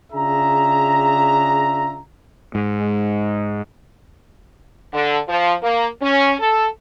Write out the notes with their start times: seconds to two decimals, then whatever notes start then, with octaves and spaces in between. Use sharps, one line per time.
0.12 C#3 D4 F4 G#4 E5 A#5
2.55 G#2
4.94 D3
5.29 F3
5.63 A#3
6.02 C#4
6.40 A4